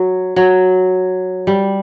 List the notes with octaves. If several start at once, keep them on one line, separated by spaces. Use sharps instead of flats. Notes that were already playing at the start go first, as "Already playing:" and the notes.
Already playing: F#3
F#3
G3